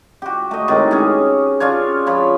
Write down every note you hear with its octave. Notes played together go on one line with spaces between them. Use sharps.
F#4 G4
A3 D#5
A2 C3 D#3 G#3
C#4 G4 G#4 C#5
C#4 D4 F4 C#5
F3 C#5 B5